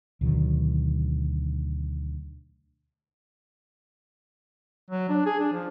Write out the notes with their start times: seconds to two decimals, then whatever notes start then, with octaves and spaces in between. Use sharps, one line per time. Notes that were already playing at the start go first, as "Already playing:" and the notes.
0.21 D2 B2 D#3 F#3
4.91 F#3
5.09 D4
5.26 G#4
5.40 D4
5.52 F3